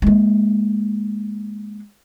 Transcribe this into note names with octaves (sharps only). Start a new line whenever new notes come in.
G#3 A#3